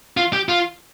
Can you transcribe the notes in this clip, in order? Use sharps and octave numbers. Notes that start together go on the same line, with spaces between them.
F4
G4
F4